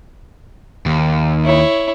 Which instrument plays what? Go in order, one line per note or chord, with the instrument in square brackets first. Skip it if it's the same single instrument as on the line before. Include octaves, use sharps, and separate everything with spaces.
[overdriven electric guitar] D#2
[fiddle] E4 C#5